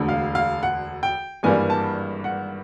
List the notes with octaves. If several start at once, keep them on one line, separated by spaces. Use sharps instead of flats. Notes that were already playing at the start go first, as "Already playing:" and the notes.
Already playing: E1 D2 D3
F5
F5
F#5
G5
G#1 G2 E3 G3 A#3 G#5
A5
F#5